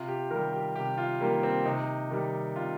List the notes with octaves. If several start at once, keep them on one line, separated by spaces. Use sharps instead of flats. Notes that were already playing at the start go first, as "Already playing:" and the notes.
Already playing: C3 F4
G4
D#3 G3 A#4
G4
C3 G4
F4
D#3 G3 A#3
C4
C3 D#4
D#3 G3
C3 F4